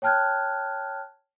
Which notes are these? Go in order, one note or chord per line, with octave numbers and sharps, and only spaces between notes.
C#5 G5 A5 F6 F#6 G#6